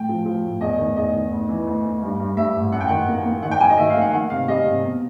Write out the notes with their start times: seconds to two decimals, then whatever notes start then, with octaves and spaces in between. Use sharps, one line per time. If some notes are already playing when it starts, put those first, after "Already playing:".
Already playing: A2 G5
0.09 F3
0.25 F3
0.44 A2
0.61 E2 D#5
0.78 D#3
0.96 E2 D#5
1.14 D#3
1.31 D2
1.49 E3
1.67 D2
1.84 D2
2.02 G2
2.20 G2
2.37 G2 E5
2.55 A1
2.72 F#2 F#5
2.80 G5
2.88 D#3 F#5
3.08 A#3
3.25 A#3
3.42 D#3 F#5
3.51 G5
3.60 F#3 G#5
3.69 D#5
3.78 D#3 E5
3.90 F5
3.95 A#3
4.01 F#5
4.12 D#3 F#5
4.30 C3 F5
4.48 G3 D#5
4.66 C3
4.84 B2